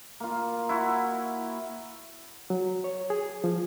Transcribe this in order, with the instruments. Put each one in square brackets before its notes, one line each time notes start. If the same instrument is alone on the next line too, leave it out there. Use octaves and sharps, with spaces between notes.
[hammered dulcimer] A#3 F4
E4 F#4
[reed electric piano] F#3
C#5
G#4
F3